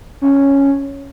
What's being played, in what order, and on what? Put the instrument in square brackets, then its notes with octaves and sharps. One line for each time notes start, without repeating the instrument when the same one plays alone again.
[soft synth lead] C#4